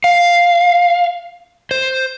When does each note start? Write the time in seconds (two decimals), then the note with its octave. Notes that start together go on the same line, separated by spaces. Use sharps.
0.04 F5
1.71 C5